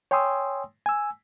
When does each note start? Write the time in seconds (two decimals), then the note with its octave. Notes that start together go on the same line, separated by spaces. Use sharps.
0.11 C#5 G5 G#5 C6 D#6 E6
0.86 G#5 E6